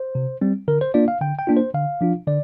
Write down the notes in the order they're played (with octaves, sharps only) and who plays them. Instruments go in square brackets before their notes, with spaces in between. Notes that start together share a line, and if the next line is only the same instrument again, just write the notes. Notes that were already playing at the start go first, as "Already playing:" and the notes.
Already playing: [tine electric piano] C5
C3
G3 C4
D3 A#4
C5
A#3 D4 F4 D5
F5
D3 G5
G5
A#3 D4 F4
C5
D3 F5
F3 D4 F4
D3 D5